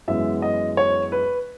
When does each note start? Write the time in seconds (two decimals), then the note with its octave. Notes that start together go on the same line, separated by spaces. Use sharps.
0.08 F#2 E3 G#3 B3 E5
0.42 D#5
0.77 C#5
1.12 B4